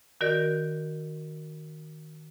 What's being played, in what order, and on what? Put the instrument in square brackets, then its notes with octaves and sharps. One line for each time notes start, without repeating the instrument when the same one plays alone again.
[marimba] D#3 F#4 A#4 D5 G6